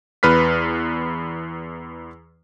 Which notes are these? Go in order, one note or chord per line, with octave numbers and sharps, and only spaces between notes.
E2 B4 F6 B6